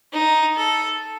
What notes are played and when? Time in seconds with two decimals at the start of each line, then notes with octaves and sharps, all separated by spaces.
0.13 D#4
0.57 A4